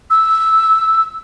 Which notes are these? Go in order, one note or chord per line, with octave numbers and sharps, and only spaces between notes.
E6